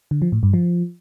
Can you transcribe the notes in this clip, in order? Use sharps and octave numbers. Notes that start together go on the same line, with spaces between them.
D3
F3
A2
G2
F3